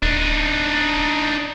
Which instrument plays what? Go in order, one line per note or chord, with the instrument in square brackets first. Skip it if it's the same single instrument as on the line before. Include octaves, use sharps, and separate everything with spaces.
[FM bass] D1 [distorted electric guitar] D4 D#4